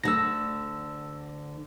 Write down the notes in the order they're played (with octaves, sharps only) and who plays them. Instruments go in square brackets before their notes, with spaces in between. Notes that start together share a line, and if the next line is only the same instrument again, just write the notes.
[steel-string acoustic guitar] D2 D3 [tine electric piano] E6 A#6